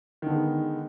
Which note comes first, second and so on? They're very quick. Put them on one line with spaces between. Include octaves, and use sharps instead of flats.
D#3 D3 B3 G#3